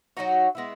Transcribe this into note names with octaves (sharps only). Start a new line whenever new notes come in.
F#3 A#3 D#4 F#4
G#3 B3 E4